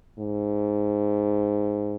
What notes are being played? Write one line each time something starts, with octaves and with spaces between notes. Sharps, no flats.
G#2